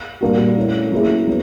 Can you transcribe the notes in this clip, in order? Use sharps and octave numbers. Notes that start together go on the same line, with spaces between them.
A#2 G3 A#3 D4 F#4
A3 C#4 E4
F#3 A#3 C#4 E4 G#4
F#3 B3